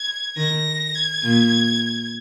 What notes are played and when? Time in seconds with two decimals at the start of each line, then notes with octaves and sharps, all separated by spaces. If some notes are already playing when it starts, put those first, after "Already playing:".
Already playing: G#6
0.37 D#3 A#6
0.95 G#6
1.23 A#2